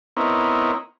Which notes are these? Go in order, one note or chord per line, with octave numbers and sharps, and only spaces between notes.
B3 C4 D#4 E4 A#4 C#5